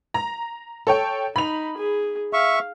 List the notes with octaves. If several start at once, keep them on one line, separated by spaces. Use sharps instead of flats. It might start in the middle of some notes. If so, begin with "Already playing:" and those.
A#5
A4 C#5 G5
D#4 B5 F7
G#4
E5 F5 C#6